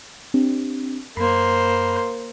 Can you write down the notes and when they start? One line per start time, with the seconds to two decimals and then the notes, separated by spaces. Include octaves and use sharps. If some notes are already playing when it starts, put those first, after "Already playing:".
0.34 C4 D4 G4
1.17 F#2 A#3 C5 B5 C7